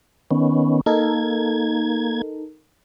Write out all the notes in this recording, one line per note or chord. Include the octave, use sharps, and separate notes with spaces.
D#3 B3 C#4
A#3 D#4 A4 A#4 G#6